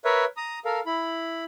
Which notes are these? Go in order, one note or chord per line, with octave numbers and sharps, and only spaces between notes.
A#4 B4 C#5 E5
A#5 D#6
A4 A#4 F5
E4 B5